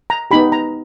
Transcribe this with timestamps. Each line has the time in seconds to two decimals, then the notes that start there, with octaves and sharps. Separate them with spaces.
0.10 A#5
0.31 B3 D#4 G4 B5
0.52 A#5